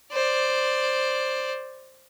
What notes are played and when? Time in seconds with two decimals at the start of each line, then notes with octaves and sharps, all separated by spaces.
0.13 C5 D5